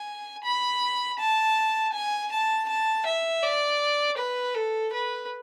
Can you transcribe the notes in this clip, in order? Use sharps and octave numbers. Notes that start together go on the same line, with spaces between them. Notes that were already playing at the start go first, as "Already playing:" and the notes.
Already playing: G#5
B5
A5
G#5
A5
A5
E5
D5
B4
A4
B4